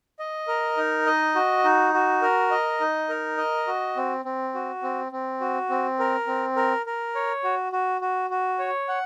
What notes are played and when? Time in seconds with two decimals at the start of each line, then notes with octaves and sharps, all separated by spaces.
0.19 D#5
0.48 A#4
0.77 D#4
1.06 D#5
1.35 F#4
1.64 D#4
1.94 F#4
2.22 A#4
2.51 D#5
2.80 D#4
3.09 A#4
3.37 D#5
3.67 F#4
3.96 C4
4.25 C4
4.54 F#4
4.83 C4
5.12 C4
5.40 F#4
5.70 C4
5.99 A#4
6.27 C4
6.56 A#4
6.86 A#4
7.15 C#5
7.44 F#4
7.72 F#4
8.01 F#4
8.30 F#4
8.59 C#5
8.89 F#5